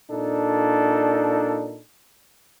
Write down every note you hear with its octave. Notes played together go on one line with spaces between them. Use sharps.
A#2 D4 D#4 A4